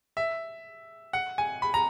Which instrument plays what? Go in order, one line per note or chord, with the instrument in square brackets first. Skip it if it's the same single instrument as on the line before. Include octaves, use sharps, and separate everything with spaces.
[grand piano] E5
F#5
G#5
B5
A#5